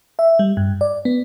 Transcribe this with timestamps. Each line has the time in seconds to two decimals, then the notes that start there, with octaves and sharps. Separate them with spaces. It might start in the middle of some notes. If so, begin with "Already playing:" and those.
0.19 E5
0.39 G3
0.57 G2
0.81 D5
1.05 B3